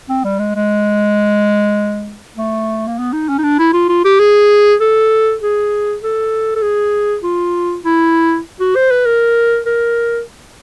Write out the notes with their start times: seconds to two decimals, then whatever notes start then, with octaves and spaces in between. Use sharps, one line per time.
0.10 C4
0.24 G3
0.39 G#3
0.55 G#3
2.37 A3
2.87 A#3
2.99 B3
3.13 D#4
3.29 C#4
3.39 D#4
3.43 D4
3.59 E4
3.73 F4
3.89 F4
4.05 G4
4.20 G#4
4.81 A4
5.41 G#4
6.02 A4
6.56 A4
6.62 G#4
7.23 F4
7.84 E4
8.60 F#4
8.76 C5
8.91 B4
9.06 A#4
9.66 A#4